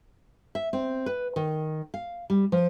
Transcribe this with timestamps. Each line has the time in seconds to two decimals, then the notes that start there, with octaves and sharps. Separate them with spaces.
0.55 E5
0.73 C4
1.06 B4
1.36 D#3
1.94 F5
2.30 G3
2.52 F3